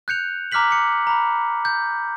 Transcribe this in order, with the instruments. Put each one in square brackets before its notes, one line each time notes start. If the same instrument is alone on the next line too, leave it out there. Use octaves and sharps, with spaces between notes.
[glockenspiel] F#6 G6 C#7 F7
A#5 D6 F6 F#6 B6 F#7
D6 C#7
A#5 B5
G6